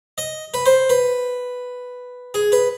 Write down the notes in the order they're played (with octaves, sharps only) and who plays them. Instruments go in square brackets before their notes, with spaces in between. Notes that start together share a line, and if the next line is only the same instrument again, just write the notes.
[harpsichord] D#5
B4
C5
B4
G#4
B4